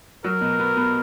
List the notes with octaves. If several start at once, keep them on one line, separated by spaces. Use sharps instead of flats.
F#3 A#4
B2
B3
B3